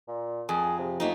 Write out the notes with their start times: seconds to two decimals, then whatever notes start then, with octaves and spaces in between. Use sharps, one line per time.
0.08 A#2
0.49 F2 G#4
0.79 C3
1.00 F2 A3 A#3 D#4